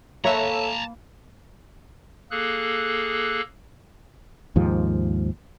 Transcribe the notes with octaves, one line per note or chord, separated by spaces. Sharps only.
A#3 A4 B4 C#5 E5 A5 A#5
A#3 G#4 A4 F#6
D#2 G#2 F3